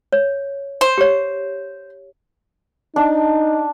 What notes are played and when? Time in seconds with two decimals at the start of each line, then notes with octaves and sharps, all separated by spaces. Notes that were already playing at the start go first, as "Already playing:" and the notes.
0.12 C#5
0.81 C5
0.98 G4 C#5
2.96 D4 D#4